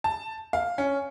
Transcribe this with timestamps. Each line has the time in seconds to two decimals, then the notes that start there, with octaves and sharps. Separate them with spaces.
0.04 A5
0.53 F5
0.78 C#4